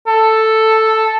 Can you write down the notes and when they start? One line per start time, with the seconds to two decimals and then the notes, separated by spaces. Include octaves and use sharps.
0.07 A4